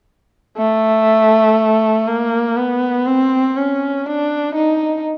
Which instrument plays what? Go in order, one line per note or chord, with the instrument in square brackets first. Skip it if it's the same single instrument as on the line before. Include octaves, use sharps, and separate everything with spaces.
[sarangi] A3
A#3
B3
C4
C#4
D4
D#4